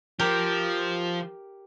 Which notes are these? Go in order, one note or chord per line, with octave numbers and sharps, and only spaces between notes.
F3 G4 A#4